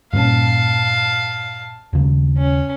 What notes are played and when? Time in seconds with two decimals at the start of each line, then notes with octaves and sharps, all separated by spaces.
0.13 G2 A#2 C#4 F5 A5
1.93 D#2 C#3
2.37 C#4